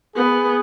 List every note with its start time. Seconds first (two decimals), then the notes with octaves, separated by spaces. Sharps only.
0.16 B3 G#4